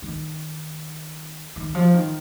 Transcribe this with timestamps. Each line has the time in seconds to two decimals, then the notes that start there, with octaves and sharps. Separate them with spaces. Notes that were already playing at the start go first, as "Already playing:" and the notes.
0.02 D#3
1.56 D#3
1.75 F3
1.94 D#3